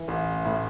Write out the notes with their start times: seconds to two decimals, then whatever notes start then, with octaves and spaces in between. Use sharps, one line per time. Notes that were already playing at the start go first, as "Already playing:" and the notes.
Already playing: E3
0.08 A1
0.45 A2